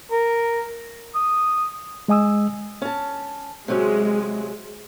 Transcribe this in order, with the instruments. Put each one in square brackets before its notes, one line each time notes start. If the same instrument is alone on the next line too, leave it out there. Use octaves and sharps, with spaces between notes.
[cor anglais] A#4
[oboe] D#6
[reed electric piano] G#3 D#5 G#5 D#6 E6
[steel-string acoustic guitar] C#4 A5
[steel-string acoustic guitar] C3 F#3 C#4 [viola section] G#3